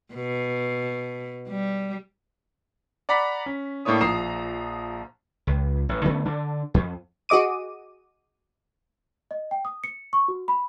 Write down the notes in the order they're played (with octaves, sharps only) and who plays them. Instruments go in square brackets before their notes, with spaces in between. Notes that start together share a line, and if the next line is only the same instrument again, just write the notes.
[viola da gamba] B2
G3
[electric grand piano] D5 F#5 A#5 B5 B6
C#4
A2 A#3 D4 E4 C#5 D#6
A#1 F3 A#5 D#6 C7 E7
[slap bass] C#2
A1
D3 A3 B3 C#4
D3 D4
F2
[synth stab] F#4 G#4 D#5 D6 D#7
[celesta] D#5
G5
D#6
C#7
C#6
F#4
B5